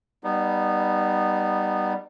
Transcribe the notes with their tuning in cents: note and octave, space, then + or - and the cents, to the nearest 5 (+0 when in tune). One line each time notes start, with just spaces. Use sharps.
G3 +0 B3 -5 D#4 -25